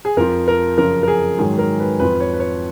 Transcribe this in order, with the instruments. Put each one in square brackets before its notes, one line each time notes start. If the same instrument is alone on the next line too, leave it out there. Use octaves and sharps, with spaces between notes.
[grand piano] G#4
F2 F3 A#4
A#4
F#2 C#3 F3 A#4
A#4
G#4
G#2 D#3 F#3 G#4
A#4
B4
F2 F3 B4
C#5
B4
C#5